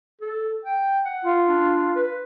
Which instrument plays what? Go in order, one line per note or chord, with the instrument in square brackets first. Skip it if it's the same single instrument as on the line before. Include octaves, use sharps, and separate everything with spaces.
[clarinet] A4
G5
F#5
[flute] F4
[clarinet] D4
B4